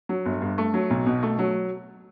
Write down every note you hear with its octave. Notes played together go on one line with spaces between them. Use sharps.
F#3
G1
G2
A3
F#3
B1
B2
A3
F#3